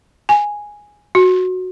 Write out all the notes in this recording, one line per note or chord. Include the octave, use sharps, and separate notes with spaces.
G#5
F#4